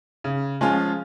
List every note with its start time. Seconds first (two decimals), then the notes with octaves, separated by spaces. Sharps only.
0.24 C#3
0.61 F3 G#3 C#4 F4